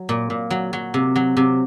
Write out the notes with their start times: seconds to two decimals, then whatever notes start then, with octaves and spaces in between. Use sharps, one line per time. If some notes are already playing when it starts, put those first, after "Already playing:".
Already playing: F#3
0.09 A#2
0.30 A#2
0.50 F#3
0.73 F#3
0.94 C3
1.16 F#3
1.37 C3